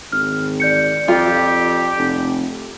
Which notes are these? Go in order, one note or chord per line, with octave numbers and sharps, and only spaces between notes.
G#1 F6
D5 G6 C#7
F2 F4 G4
F1